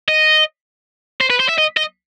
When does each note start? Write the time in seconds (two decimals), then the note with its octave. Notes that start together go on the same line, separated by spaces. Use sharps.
0.08 D#5
1.21 C5
1.30 B4
1.40 C5
1.49 E5
1.58 D#5
1.77 D#5